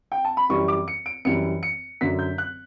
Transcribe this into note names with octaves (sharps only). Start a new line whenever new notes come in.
G5
A5
B5
F#2 E3 G3 C#6
D6
C#7
D7
F#2 E3 G3 C#7
C#7
F#2 D3 F#3 B6
G6
F#6